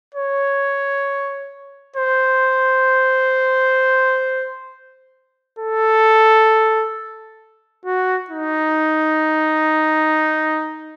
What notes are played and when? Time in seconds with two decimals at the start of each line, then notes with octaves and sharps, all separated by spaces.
0.14 C#5
1.96 C5
5.59 A4
7.85 F#4
8.30 D#4